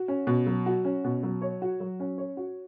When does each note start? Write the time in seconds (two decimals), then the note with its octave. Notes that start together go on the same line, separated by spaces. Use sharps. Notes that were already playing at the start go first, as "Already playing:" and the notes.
Already playing: F#4
0.08 C#4
0.27 B2
0.46 F#3
0.66 F#4
0.85 C#4
1.04 B2
1.23 F#3
1.42 C#5
1.62 F#4
1.80 F#3
2.00 C#4
2.18 C#5
2.37 F#4